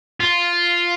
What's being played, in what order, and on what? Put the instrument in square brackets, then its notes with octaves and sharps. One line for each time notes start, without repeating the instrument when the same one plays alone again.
[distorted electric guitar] F4